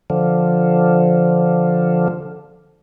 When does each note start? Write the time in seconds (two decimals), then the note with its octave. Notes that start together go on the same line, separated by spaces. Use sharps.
0.10 D3 F3